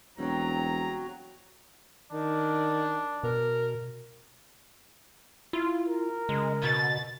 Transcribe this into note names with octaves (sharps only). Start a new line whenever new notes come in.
E1 F#3 G3 C4 A#5
D#3 D4
B2 A#4
E4 F4
A#4
C#3 G#3
B2 A6